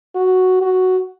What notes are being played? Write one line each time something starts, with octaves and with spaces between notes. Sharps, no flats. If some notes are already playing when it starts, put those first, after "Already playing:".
F#4
F#4